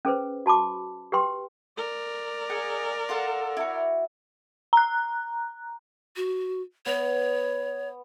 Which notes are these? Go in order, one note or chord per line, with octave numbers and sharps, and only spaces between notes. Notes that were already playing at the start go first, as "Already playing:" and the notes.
C#4 G#4 B4 C5
F#4 A5 B5 D6
G4 B4 G5 C6
A#4 D5
G#4 D#5 F#5
F4 A4 F#5
E4 F#4
A#5 F#6
F#4
B3 C#5